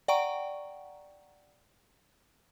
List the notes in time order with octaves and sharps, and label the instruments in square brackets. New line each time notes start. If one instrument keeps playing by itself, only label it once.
[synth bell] D5 F#5 G5 A#5 C#6 D7